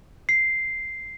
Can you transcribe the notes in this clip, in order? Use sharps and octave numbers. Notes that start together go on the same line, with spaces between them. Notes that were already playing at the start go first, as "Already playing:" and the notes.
C7